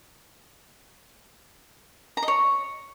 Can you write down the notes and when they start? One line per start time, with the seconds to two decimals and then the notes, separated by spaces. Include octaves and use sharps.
2.17 A#5
2.22 D#5
2.28 C#5